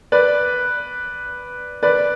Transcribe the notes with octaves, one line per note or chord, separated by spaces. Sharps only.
B4 D5
B4 D5